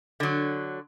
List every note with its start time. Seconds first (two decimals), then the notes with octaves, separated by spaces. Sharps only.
0.20 D3 F#3